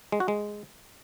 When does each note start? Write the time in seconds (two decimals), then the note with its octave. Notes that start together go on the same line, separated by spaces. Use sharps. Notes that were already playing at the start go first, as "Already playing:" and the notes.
0.12 G#3
0.20 F#4
0.28 G#3